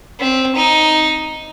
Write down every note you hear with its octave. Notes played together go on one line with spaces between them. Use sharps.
C4
D#4